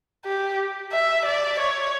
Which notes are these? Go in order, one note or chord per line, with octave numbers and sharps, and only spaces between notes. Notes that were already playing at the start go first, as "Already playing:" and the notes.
G4
E5
D5
C#5